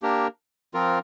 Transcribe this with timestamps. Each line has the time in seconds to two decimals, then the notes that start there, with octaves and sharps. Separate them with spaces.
0.02 A#3 D4 G4 A#4
0.74 F3 C4 F4 A#4